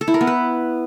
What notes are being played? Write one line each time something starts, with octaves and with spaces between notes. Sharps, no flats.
A4
E4
A#4
B3
B4